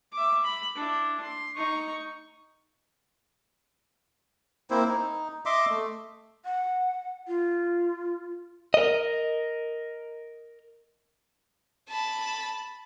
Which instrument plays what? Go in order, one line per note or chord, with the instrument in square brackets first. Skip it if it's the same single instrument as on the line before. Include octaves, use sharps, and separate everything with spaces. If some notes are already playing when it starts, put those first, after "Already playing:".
[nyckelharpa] E5 D6
B5
D4 E4
C6
D#4 C#6
[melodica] A#3 C4 E4 C5
D#4
D#5 E5 C6 D6
A3
[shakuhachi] F#5
F4
[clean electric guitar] A#4 D#5
[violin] A5 B5